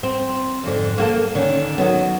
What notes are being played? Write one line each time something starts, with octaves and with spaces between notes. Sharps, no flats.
C4
F2 G#2 D3
A#3 F#4 A4
D3 D#3 C#4
D#3 F#3 B3